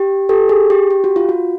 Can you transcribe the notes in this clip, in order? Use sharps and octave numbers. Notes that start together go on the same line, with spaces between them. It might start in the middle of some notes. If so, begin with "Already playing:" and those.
Already playing: G4
G4 A4
G#4
G4
G4
F#4
F4
F#4